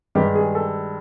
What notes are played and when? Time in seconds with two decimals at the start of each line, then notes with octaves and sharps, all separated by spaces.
0.15 G2 D#3 G#3 G4
0.35 G#4
0.55 A4